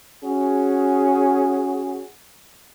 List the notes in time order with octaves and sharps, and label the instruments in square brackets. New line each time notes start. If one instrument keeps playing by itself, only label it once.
[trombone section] C#4 F#4 G#4